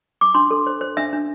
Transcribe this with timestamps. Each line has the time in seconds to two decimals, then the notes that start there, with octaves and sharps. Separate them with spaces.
0.21 D6
0.35 D4 C6
0.51 A4
0.66 C5
0.81 C5
0.97 D4 E5
1.13 D4